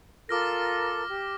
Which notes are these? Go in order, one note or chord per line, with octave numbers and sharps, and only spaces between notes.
F4 A4 A#4 D6 F6 A#6
G4